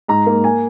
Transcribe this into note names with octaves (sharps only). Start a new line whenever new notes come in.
G#2 A#5
A#3
G#5